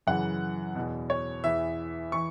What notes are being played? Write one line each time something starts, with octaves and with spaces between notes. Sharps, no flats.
F#2 C#3 E3 F#5
E2 B2
C#5
E2 E3 E5
E3 C#6